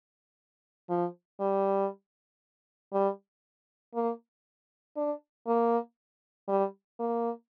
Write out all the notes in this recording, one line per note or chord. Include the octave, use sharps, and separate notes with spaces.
F3
G3
G3
A#3
D4
A#3
G3
A#3